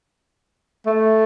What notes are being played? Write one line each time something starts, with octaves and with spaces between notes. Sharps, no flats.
A3